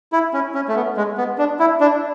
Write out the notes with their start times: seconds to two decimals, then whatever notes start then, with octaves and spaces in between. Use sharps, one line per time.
0.13 E4
0.33 C#4
0.54 C#4
0.68 A3
0.75 B3
0.97 G#3
1.17 B3
1.38 D4
1.59 E4
1.80 D4